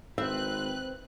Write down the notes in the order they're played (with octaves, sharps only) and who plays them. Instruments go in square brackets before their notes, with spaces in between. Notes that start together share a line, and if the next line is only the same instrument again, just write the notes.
[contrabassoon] G#1 [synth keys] C4 [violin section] B4 F#6 [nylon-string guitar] E5